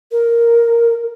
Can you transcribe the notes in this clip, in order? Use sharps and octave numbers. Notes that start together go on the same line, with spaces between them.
A#4